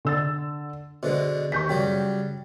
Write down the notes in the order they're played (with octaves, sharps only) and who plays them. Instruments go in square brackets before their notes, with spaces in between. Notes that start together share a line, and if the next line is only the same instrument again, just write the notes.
[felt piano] D3 E6 A6
[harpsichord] B2 D3 G#3 [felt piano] C5
[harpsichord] D#2 [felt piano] C#6 G6 B6
[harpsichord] C#3 F#3 G3 [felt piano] G5